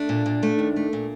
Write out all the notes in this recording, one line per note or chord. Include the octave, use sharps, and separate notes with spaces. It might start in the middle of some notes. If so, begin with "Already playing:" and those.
Already playing: A3 D4
A#2
A#2
A3
D#2
A3
A#2